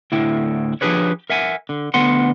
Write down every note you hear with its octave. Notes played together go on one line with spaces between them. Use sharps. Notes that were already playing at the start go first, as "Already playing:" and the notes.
D2 A2 E4 G5
F3 D4 G4 G#4 B4 C#5
A#4 E5 F#5 G#5
D3
D2 D3 B3 F#5 C6